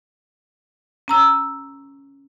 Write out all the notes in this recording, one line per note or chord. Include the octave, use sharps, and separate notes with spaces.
C#4 A#5 E6